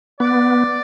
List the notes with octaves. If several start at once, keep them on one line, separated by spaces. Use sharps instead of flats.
B3 D5